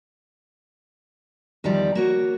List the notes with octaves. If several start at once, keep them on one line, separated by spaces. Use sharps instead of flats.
E2 D#3 F3 G3 D5
A#3 F#4 C#5